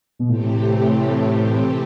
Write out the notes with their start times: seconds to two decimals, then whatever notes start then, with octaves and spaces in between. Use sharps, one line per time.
0.19 B2
0.29 A2 C3 E3 A3 C4 G4